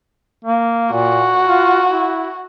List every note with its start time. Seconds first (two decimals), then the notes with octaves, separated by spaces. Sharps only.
0.44 A#3
0.93 A#2 F#4
1.47 F4
1.89 E4